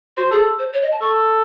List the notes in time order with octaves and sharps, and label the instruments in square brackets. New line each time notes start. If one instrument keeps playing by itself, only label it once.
[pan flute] F#4 [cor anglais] C5
[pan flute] G#4 [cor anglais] A4
[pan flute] C5
C#5
D#5
A5
[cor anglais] A4 [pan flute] C#6